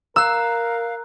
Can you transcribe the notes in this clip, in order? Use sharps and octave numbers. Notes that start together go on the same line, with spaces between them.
A#4 F5 A#5 E6 F#6